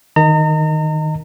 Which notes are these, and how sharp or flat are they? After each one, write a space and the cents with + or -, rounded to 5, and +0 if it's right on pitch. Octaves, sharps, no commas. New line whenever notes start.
D#3 +0 D#5 +0 A#5 -35